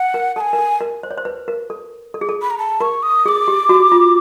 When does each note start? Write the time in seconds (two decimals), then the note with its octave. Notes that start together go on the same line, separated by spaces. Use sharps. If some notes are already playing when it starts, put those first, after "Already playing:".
Already playing: F#5
0.14 A#4
0.36 A4 A5
0.41 G#5
0.53 A#4
0.58 A4
0.81 A#4
1.03 C5
1.11 C#5
1.18 C5
1.25 B4
1.48 A#4
1.70 A4
2.14 A4
2.21 G#4
2.29 A4
2.42 B5
2.51 A#5
2.58 A5
2.81 A#4 C#6
3.03 D#6
3.25 G#4 D6 D#6
3.48 G4
3.69 F#4
3.92 F4